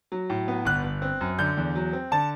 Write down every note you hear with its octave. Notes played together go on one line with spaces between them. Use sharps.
F#3
A2
B3
G1 F#6
G1
C4
F#2
D3 G6
E2
F#3
C4
D3 A5